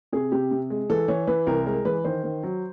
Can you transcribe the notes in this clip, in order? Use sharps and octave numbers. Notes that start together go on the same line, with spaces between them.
C3 G#4
C3 G4
C3
G#3
E3 A4
E3 C#5
E3 B4
C2 A#4
G#3 A#4
E3 B4
D#3 C5
D#3
F#3